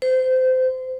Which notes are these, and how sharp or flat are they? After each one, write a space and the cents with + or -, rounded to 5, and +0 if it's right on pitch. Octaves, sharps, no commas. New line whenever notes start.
C5 -25